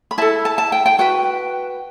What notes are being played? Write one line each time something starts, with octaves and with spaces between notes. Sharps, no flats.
B5
E4 A4 A5
A5
A5
G5
G5
F#4 B4 G5